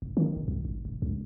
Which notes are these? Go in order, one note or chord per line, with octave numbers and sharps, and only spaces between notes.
F1
D#3
E1
C2
G#1
E1
C#2